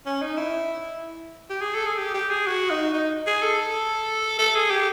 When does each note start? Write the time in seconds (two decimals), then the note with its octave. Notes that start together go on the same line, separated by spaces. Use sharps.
0.06 C#4
0.21 D#4
0.38 E4
1.50 G4
1.61 G#4
1.75 A4
1.86 G#4
1.98 G4
2.14 G4
2.30 G#4
2.47 F#4
2.70 D#4
2.94 D#4
3.27 G#4
3.42 A4
4.39 A4
4.55 G#4
4.70 G4